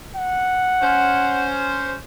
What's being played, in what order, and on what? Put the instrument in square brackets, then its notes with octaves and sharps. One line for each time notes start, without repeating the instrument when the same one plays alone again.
[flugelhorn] F#5
[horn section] C#4 C5